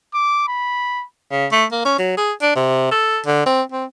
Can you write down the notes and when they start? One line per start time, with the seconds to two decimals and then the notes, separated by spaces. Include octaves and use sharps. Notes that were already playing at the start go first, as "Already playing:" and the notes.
0.14 D6
0.47 B5
1.31 C#3
1.52 A3
1.71 A#3
1.85 C#4
1.98 F#3
2.17 G#4
2.42 D4
2.56 C3
2.91 A4
3.26 D3
3.46 C4
3.72 C4